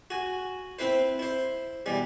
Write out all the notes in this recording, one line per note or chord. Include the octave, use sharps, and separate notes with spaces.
F#4 G#5
C4 E4 B4 C5
E4 C5
B2 E3 G3